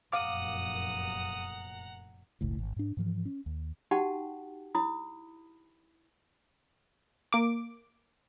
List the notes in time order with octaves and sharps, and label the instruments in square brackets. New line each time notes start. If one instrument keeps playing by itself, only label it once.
[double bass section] F1 F#2 A#2 [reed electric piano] F5 D6 [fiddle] F#5 A#5 [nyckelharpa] D#6
[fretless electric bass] F#1 C#2 A2
G#1
G#2 D4
G#2 E3 F3
C#4
D#2
[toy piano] D#4 F#4 G4 F#5 G5 A5
E4 B5 D#6
[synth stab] A#3 D6